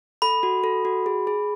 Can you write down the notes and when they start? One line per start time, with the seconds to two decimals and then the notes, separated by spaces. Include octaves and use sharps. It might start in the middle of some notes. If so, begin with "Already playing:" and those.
0.22 A4 B5
0.43 F#4
0.64 A4
0.85 F#4
1.06 G#4
1.27 G#4